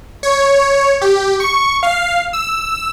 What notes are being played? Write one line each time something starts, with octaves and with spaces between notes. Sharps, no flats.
C#5
G4
C#6
F5
E6